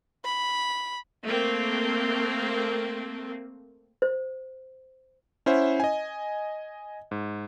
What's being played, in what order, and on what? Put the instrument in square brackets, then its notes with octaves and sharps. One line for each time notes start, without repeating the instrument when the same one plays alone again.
[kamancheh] B5
[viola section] A3 A#3 C4
[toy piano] C5
[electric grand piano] C#4 E4 C5 E5 F#5
D#5 G#5
G#2